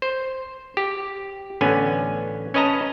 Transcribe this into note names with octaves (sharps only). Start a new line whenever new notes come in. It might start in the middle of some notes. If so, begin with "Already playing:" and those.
C5
G4
A1 D3 B3 C#4 G#5
C#4 B4 D#5 A5 A#5